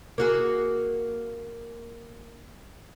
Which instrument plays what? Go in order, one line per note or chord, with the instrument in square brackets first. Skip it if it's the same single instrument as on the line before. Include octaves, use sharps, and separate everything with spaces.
[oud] A#3 F#4 G#4